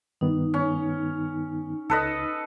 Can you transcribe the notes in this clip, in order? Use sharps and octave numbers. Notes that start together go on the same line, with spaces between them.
G2 D#3 B3 D#4
C#4
C#2 A4 B4 D#5